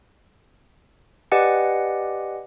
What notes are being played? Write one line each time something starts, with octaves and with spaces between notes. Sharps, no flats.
G4 B4 D5 D#5 F#5 G#5